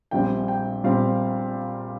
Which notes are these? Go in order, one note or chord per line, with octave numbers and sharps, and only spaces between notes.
A#1 A#2 G3 C4 G5
G5
A#2 G3 C4 F5